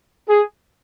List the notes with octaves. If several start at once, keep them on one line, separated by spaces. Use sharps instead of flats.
G#4